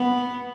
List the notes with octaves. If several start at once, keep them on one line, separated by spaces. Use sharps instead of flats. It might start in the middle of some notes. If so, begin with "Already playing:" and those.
Already playing: B3